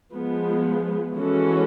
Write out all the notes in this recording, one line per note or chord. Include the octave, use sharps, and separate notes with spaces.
F3 G#3 B3
E3 G#3 C#4 F#4 A4